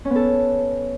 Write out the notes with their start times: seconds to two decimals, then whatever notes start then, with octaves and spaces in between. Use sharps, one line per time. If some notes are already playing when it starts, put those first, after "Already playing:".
0.05 C#4
0.10 B3
0.16 A4